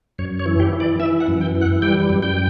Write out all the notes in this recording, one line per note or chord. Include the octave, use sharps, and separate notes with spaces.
F#2 C#5
C#5
E3
G4
E3
D5
E3 E5
F#5
F#2
G5
E3
F#5
G3 G5
F#2
G5